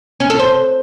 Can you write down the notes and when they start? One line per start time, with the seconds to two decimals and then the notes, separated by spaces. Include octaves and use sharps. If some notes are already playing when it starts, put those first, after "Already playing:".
0.20 C#4
0.30 A4
0.39 C5